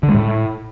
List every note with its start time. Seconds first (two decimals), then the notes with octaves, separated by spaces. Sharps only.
0.03 D3
0.09 G#3
0.15 A2